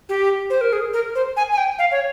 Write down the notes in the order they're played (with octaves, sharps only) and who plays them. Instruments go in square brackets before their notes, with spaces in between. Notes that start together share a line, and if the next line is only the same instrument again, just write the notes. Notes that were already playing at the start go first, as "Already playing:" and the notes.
[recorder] G4
C5
A#4
G#4
A#4
C5
G#5
G#5
G5
F5
C#5